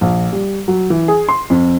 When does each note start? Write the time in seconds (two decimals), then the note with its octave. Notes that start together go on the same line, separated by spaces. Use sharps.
0.01 A#1
0.33 G3
0.68 F#3
0.90 E3
1.08 G#4
1.29 C6
1.50 F2